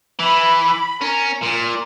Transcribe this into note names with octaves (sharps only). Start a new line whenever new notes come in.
E3 B5
C#4 A#4
A#2 F6